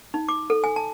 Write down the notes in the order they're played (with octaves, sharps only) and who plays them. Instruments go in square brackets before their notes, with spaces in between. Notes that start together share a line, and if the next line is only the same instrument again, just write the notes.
[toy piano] D#4
D6
A4
G#5
A5